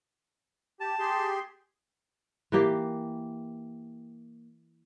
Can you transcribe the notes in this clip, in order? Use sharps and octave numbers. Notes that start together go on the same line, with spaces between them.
G4 A5
G4 G#4 C6
E3 A#3 G4